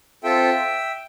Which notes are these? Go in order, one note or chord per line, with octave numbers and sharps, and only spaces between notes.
C4 F4 A4 E5 G5